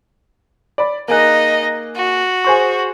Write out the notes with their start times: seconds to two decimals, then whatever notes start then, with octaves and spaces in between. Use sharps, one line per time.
0.78 D5 B5
1.08 A#3 D#4 G#4 D#5 F#6
1.96 F#4
2.44 G#4 C5 C#6